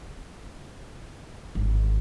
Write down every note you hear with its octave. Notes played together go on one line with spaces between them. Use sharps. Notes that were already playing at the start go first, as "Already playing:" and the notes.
G#1